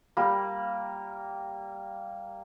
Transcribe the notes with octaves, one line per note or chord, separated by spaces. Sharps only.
G3 A#3